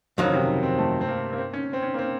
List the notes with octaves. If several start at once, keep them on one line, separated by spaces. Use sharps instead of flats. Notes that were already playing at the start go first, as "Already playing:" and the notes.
F2 D#3 F#3
C#3
C3
C4
A3
C4
A#3
A#3
C4
C#4
C4
C#4
A#3
C4